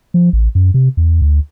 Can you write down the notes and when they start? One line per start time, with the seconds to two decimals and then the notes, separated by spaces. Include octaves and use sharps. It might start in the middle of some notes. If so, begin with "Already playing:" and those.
0.14 F3
0.33 A1
0.55 F#2
0.74 C3
0.97 E2
1.22 D2